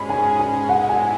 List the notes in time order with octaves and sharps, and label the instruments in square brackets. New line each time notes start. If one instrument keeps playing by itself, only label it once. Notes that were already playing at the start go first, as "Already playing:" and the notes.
Already playing: [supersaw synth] G#2 G#3 C#4 G#4 [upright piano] B5
[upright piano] G#5
G#5
[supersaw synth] A2 G#3 B3 E4 A4 [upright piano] F#5
[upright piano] G#5